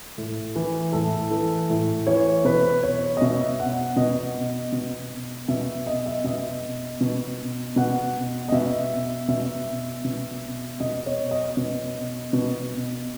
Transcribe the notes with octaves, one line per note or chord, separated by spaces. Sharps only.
A2
E3
A2 A4
E3 A4
A2
E3 C#5
B2 B4
C#5
D#5
B2 E5
F#5
B2 D#5
B2
B2 E5
D#5
E5
B2 D#5
B2
B2 F#5
D#5
B2 E5
B2 E5
B2
B2 D#5
C#5
D#5
B2
B2